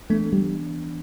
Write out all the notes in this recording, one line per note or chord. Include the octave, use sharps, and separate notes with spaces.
E3 A3 B3 D4
G3